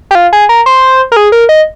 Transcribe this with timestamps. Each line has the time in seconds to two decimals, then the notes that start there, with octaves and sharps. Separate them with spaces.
0.11 G4
0.15 F4
0.33 G#4
0.49 A#4
0.66 C5
1.12 A#4
1.17 G#4
1.32 A#4
1.49 D#5